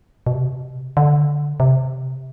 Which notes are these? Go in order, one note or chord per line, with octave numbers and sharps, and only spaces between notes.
B2
C3
D3
C3